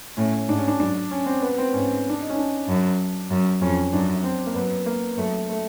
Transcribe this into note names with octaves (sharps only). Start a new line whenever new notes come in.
A2 C#4
G#2 D4
C#4
D4
F#2 D4
C#4
C4
B3
C4
G#2 C#4
D4
D#4
C#4
D4
F#2
F#2
F2 C#4
F#2 D4
C4
A#3
F#2 B3
A#3
F#2 A3
A3